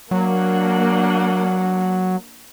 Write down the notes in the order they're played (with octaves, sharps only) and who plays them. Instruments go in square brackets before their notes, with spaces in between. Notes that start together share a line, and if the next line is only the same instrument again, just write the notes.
[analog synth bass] F#3 [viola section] A#3 D4 F#5